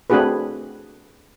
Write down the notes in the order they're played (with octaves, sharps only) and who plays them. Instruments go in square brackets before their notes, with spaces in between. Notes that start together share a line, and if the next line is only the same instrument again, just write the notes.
[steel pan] A3 C4 D4 F#4 G#4 B4